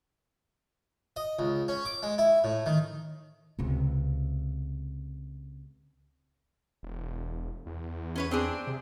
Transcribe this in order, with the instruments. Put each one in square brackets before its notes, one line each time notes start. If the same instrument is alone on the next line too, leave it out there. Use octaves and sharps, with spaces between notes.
[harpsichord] D#5
C#2
C#4
D6
G#3
E4
A2
D#3
[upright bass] C#2 C3
[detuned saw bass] E1
E2
[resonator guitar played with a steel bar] C#4 B4 C#5
C4 D4 G#4
[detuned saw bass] C3